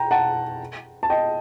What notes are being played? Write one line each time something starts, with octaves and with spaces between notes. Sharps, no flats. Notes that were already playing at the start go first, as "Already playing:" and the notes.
Already playing: G5 A#5
F#5 A5
A5
D#5 G5